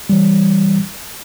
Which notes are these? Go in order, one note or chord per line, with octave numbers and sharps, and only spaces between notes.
E3 G3